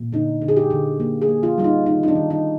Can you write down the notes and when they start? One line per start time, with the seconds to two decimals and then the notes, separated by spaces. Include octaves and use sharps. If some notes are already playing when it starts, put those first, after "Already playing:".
Already playing: A#2
0.12 D3 D#4
0.42 D3
0.48 G#4
0.57 G4
0.70 D3
1.00 A#3
1.22 G#4
1.29 A#3
1.43 F4
1.58 G3 F4
1.64 D#4
1.86 D#3 D#4
2.03 D#4
2.08 D4
2.15 D#3
2.30 D#4